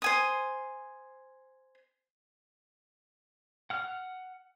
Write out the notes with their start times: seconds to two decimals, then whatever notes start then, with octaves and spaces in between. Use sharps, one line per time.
0.02 C5 G#5 D#6
3.70 F#5 F6